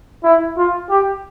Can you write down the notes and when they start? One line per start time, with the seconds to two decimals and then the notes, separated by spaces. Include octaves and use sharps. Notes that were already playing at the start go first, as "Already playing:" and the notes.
0.24 E4
0.57 F4
0.89 G4